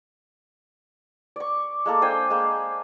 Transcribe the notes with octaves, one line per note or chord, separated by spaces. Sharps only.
D5 C#6
G#3 A#3 A4
D4 C5 G5 G#5
G#3 A#3